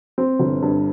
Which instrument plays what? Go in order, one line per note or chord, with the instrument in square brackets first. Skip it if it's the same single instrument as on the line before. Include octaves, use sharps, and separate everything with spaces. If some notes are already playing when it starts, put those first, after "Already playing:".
[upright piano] C4
G1
G2